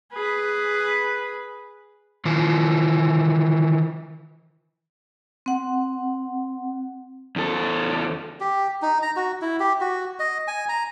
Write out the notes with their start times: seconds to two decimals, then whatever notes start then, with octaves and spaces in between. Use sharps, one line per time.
0.14 G#4 B4
2.25 D#3 E3 F4
5.46 C4 F#5
7.36 E2 A4
8.40 G4
8.82 D#4
9.02 A#5
9.16 F#4
9.41 E4
9.60 G4
9.81 F#4
10.20 D#5
10.47 G#5
10.69 A#5